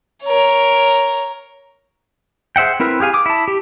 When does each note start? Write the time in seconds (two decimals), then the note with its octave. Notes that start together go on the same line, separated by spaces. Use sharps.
0.24 A#4 C#5
2.56 G#4 C5 E5 F#5 G5
2.80 C4 E4 A#4 B4
3.00 G4 G#4 F5 G#5
3.14 D6 D#6
3.26 E4 A5
3.48 G4